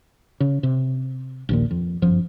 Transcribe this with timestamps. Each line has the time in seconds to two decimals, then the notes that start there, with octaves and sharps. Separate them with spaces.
0.40 C#3
0.63 C3
1.49 A#1 D#2 A#2
1.71 F2
2.02 G1 F#2 F3